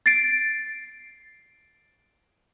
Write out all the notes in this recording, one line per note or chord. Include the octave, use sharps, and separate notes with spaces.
A6 C7 D7